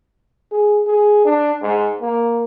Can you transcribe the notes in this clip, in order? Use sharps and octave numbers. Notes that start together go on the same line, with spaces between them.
G#4
G#4
D4
G#2
A#3